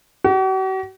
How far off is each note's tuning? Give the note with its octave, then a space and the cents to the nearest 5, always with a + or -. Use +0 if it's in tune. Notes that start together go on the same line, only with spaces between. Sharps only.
F#4 +45